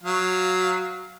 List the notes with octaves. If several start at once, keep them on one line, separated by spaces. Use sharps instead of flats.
F#3 F5